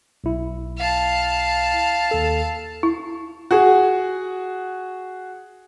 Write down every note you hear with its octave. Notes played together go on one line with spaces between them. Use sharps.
B1 E4
F5 A5
D#2 A4
E4
F#4 G#4